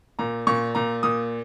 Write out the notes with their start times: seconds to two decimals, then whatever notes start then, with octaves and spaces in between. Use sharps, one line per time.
0.19 A#2 A#5
0.47 A#2 C#6
0.75 A#2 A#5
1.03 A#2 D#6